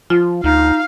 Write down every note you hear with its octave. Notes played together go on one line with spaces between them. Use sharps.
F3 F4
D2 D#4 F5